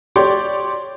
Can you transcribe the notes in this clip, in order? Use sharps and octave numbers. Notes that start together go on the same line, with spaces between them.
G4 C#5 D5 C6 D6